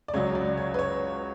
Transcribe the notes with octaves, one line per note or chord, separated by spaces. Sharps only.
D5
C#2 C#3 F#3 C#4 C#5
D5
C#5
B4
C#5